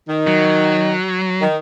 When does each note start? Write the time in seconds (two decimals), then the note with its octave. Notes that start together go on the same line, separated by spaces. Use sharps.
0.09 D#3
0.27 F#3
1.42 D#3